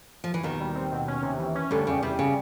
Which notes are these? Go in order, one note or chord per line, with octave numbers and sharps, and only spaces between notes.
F3
E3
D#2 B2 D#3
G3
C4
B2
C#4
C3
E3
C#4
D2 D3 G3
E2 C#3
C3 G3
C#3